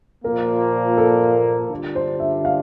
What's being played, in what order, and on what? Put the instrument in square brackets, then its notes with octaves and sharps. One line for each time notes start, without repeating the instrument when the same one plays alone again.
[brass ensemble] A#2 F3 A#3 [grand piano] A#4
[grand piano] A4
[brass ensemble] D3 G3 D4 F4
[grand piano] C5
E5
F5